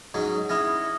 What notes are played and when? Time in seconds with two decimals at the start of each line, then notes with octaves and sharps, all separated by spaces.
0.14 G#2 F#3 C#4
0.49 C#4 E4 D#6 F6 A#6